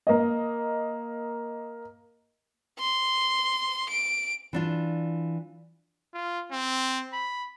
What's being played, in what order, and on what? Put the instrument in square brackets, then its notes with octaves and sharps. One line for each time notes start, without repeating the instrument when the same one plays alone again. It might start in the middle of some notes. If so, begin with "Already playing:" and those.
[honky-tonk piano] A#3 D#5
[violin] C6
D7
[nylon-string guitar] E3 D4 F4
[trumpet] F4
C4
B5